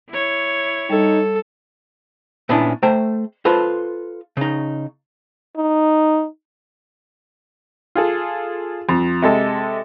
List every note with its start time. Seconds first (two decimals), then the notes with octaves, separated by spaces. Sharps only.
0.10 E4 C#5
0.90 G3 D#4 A4
2.49 A#2 B3 C#4 D4 E4
2.83 A3 C5 G5 A#5
3.45 F4 A4 B4 C5
4.37 C#3 D#4
5.57 D#4
7.95 F4 G#4 A4
8.89 F2
9.22 C3 G#3 A4